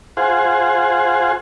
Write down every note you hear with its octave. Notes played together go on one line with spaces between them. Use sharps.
F4 G#4 C5 F#5